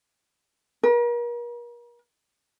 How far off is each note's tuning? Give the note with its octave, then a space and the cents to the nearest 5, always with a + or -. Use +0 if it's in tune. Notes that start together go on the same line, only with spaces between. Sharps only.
A#4 +40